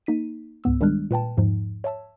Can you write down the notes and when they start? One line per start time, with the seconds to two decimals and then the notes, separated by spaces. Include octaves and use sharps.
0.06 A#3 D#4 B6 D#7
0.64 C#2 G#2 B3 E6
0.81 D#3 G3 G#3 D4 F6 F#6
1.11 A#2 B4 G5 A5
1.37 E2 G#2 F3 D#4
1.84 C#5 E5 A5 E6